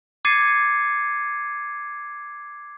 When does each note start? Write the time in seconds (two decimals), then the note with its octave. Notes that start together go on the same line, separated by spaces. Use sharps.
0.25 D6 G#6 A6 C7 C#7 D#7